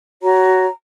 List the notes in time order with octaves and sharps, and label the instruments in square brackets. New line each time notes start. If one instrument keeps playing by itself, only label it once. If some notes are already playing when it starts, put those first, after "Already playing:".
[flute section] F#4 C#5 A#5